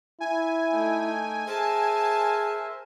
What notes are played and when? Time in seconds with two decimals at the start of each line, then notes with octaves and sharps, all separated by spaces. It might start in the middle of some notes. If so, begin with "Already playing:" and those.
0.20 E4 G#5
0.72 A3 D#4 G5
1.47 G#4 A#4 C5 E5 A5